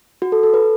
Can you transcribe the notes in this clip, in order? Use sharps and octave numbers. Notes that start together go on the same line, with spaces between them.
F#4
A4
A4
B4